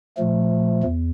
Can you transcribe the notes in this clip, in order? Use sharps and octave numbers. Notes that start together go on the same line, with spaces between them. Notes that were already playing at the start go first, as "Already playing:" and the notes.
A#2 F3 A3
E2